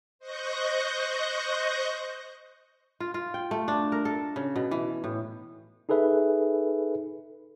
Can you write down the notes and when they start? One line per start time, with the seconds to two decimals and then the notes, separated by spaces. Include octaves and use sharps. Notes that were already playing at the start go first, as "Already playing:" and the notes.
0.19 C5 D#5 C#6 F#6 G6 A#6
3.00 F4
3.14 F4
3.34 G5
3.51 A3
3.68 D4
3.92 A#4
4.05 A4
4.36 C#3
4.56 B2
4.71 E3
5.04 A2
5.89 D#4 G#4 A4 B4 E5